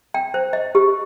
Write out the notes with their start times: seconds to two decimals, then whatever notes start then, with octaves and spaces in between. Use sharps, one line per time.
0.14 G5
0.34 C5
0.53 D#5
0.75 G4